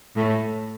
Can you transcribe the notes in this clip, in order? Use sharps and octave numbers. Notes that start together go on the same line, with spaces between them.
A2 A3